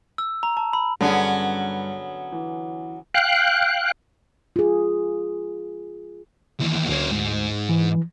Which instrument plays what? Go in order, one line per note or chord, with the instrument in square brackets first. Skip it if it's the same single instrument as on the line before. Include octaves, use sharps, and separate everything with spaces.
[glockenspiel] E6
A#5
A5
B5
[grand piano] G2 [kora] D3 G#4 [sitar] F#3 B3 C#4
[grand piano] E3
[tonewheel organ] F5 G5 F#6
[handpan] F4 G#4
[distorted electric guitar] D#2 E3
[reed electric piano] D2 [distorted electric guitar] A#3 C#4
[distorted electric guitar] G#2
[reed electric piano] E3